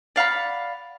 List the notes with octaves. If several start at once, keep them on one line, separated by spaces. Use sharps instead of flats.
D5 F5 F#5 B5